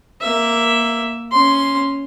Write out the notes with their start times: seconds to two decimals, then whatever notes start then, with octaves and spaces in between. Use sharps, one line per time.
0.21 A#3 E5
1.32 C#4 C6